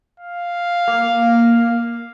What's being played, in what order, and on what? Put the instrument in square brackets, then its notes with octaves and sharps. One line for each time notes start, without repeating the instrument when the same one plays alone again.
[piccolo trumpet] F5
[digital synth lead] A#3